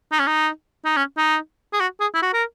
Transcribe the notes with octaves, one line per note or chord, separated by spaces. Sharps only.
D#4
C#4
D#4
D#4
C#4
D#4
G#4
F#4
G#4
E4
F#4
A#4